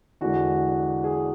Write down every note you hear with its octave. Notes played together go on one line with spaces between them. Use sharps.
E2 D3 G#3 F#4
G#4